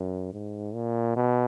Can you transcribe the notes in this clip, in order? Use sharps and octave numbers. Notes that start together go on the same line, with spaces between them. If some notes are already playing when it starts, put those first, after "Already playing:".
Already playing: F#2
G#2
A#2
B2